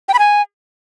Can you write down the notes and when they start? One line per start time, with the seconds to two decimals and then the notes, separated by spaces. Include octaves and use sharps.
0.09 G5
0.14 B5
0.19 G#5